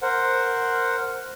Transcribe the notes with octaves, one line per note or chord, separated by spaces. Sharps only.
A#4 C5 F#5